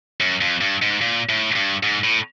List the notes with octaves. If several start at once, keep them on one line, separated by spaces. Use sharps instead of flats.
F#2
F2
G2
G#2
A#2
A2
G2
G#2
A2